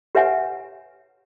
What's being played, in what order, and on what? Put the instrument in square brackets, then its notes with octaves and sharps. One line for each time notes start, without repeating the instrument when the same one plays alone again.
[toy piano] G4 B4 C#5 E5 F#5 G#5